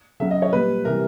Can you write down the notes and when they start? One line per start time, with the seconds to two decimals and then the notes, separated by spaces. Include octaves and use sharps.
0.20 C#3 F#3 E5
0.31 D#5
0.42 C#5
0.52 A#2 G3 B4
0.84 C3 E3 G3 A#4